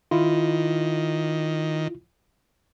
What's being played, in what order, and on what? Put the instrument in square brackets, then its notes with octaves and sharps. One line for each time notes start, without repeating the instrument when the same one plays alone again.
[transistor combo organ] D#3 [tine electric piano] E4 F4